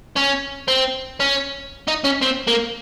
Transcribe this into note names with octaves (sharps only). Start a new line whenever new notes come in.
C#4
C4
C#4
D#4
C#4
C4
A#3